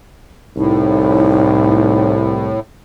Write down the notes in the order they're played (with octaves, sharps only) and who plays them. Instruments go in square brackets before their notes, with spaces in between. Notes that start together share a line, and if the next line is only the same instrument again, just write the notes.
[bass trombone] C2 [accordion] A2 [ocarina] D#4